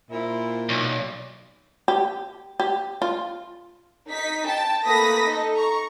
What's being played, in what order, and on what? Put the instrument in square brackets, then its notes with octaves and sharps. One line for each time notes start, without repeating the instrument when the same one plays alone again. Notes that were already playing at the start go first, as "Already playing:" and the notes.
[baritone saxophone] A#2 [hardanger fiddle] E4 C5
[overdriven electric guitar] B1 [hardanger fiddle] D5
[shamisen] G4
G4
F4
[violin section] D#4 B6
G5 A5
A3 A#3 B4 D#6 A#6 B6
D#4 A4 D#5
A#5 C#6